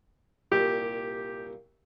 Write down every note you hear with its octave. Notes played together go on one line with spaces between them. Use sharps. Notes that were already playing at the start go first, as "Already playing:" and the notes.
C2 A#2 G4